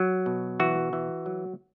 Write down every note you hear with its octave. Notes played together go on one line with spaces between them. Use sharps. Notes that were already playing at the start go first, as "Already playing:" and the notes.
Already playing: F#3
B2
E3 F#4
E3
F#3